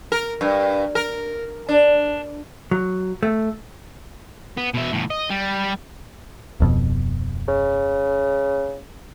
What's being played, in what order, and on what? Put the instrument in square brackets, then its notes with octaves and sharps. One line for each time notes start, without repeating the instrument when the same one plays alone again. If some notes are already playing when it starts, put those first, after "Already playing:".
[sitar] A#4
G2
A#4
D4
[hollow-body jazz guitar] F#3
A3
[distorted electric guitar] B3
B2 E5
E2 A2
D#5
G3
[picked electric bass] D1 F2 B2
[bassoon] C#3